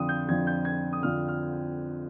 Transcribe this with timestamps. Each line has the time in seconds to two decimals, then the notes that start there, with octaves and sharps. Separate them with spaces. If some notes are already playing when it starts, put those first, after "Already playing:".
Already playing: F2 D3 F3 D#6
0.09 G6
0.28 F2 D3 F3 G#6
0.47 G6
0.65 G#6
0.93 D#6
1.03 F2 D3 F3 F6
1.28 F6